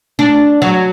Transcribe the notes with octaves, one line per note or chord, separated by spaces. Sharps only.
D4
F#3